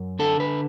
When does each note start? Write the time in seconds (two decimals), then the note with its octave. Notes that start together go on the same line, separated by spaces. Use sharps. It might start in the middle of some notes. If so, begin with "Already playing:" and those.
Already playing: F#2
0.19 D3 A4
0.40 B4